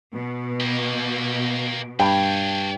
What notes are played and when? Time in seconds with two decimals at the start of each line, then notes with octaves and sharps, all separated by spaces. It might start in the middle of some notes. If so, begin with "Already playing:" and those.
0.14 B2
0.60 A#3 G4
1.99 G2 D4 C#5 G5